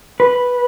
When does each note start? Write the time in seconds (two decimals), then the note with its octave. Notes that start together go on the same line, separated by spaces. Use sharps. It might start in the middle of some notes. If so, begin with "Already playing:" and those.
0.20 B4